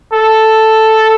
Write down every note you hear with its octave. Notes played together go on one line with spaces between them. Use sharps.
A4